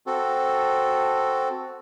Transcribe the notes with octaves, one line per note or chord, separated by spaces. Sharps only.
C4 F#4 A4